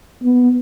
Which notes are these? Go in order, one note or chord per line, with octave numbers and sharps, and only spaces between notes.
B3